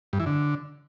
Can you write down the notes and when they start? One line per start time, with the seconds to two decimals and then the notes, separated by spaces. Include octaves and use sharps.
0.13 G2
0.20 E3
0.26 D3